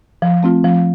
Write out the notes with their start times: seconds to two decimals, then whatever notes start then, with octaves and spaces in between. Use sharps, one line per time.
0.22 F3
0.43 A3 C4 F4
0.64 F3